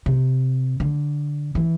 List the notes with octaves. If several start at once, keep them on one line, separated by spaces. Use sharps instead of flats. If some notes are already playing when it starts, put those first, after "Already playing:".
C3
D3
E3